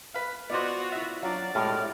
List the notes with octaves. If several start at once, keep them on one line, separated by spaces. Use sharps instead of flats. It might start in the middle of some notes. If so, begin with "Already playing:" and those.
B4 F5
B3 F4 F#4 C5 D5 D#5
E4 E5
F#3 D4 F4 D5
C2 A2 G3 G#3 F6